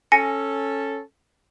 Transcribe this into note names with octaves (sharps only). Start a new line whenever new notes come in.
C#4 A4 G#5 A#6 C#7